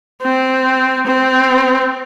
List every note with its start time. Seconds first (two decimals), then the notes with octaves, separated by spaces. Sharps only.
0.22 C4
1.06 C4